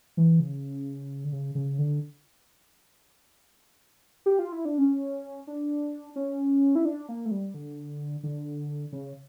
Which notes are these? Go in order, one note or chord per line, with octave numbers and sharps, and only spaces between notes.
E3
C#3
D3
C#3
C#3
D3
G4
F4
E4
D4
C#4
D4
C#4
E4
D4
A#3
A3
G3
D3
D3
C#3